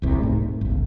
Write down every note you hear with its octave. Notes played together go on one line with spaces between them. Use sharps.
D#1 C2 C3
G#2 A3
G1 C#2